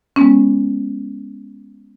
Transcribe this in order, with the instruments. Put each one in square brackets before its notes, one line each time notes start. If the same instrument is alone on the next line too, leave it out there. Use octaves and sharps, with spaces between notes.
[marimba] G#3 B3 C#4